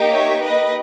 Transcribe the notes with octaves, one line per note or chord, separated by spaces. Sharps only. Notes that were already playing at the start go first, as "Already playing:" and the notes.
Already playing: A#3 D#4 G4
C#5 E5
B4 D#5